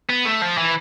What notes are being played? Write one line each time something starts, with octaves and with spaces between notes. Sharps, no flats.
B3
A3
F3
E3